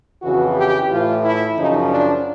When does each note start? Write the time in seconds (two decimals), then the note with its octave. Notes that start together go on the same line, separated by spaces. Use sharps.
0.22 F2 C#3 E3 F#4
0.56 G4
0.90 A2 E3 F4
1.24 E4
1.57 F#2 C#3 F3 D#4
1.91 D4